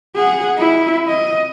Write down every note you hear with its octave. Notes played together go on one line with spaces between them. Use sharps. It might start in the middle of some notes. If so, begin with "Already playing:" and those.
G#4 F#5
E4
D#5